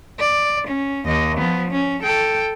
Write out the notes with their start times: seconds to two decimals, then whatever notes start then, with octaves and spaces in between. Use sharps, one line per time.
0.20 D5
0.67 C#4
1.06 D#2 D#5
1.38 F3 B3
1.71 C#4
2.03 A4 G5